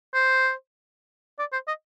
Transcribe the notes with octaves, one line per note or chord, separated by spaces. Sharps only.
C5
D5
C5
D#5